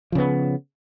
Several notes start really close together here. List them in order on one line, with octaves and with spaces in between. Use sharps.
F3 C#3 B3